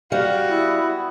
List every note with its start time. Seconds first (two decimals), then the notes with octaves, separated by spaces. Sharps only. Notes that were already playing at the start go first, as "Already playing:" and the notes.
0.12 G3 F#4 F5
0.49 B3 E4